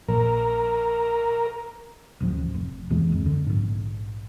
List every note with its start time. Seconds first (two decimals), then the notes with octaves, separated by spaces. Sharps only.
0.09 A#1 A#4
2.20 D1 A1 F3
2.54 F1
2.90 D#2 B2 E3 G#3
3.12 D1 F2
3.26 D3
3.47 A#1 G#2